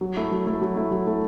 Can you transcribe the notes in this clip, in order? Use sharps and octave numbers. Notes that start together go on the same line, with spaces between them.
F#3
A3 E4
F#3
A3 E4
F#3
A3 E4
F#3
A3 E4